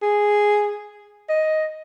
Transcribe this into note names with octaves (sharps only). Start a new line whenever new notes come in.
G#4
D#5